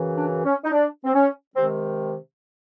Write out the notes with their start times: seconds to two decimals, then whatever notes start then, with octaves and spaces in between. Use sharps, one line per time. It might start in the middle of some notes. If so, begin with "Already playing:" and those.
Already playing: F#2 C#3 E3
0.17 D4
0.45 C#4
0.65 D#4
0.72 D4
1.05 C4
1.14 C#4
1.56 C3 D#3 G#3 C4